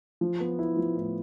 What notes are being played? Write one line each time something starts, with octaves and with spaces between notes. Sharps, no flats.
F3
B3
E4
F3
A2